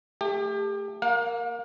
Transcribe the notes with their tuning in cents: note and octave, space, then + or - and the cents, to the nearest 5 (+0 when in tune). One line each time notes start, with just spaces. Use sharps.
A3 +0 G4 +35
A#3 +0 F5 +40